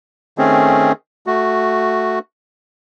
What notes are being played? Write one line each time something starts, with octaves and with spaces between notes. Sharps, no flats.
D#3 A3 C4 C#4 G#4
A3 F#4